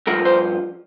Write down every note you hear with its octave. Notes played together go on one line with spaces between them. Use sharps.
G2 F3 A#4
C5